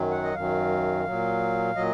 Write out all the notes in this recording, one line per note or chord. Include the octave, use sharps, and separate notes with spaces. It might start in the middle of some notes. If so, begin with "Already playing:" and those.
Already playing: F#2 D#3 F#3
F#5
D#5
F#2 D#3 F#3 F5
A#2 F#3
A#2 F#3 D#5